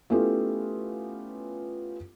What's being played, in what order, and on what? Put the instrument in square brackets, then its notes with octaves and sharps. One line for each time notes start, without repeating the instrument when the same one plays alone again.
[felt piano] A3 B3 C#4 E4 F4 G4